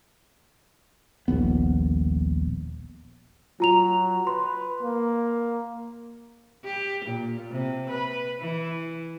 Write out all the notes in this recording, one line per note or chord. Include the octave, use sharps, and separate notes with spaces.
D#1 A#1 B3
F#3 F4 A#5 F7
B4 C6
A#3
G4
A#2
C3
B4
E3